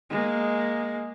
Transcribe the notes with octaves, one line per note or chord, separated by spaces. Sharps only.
G#3 A#3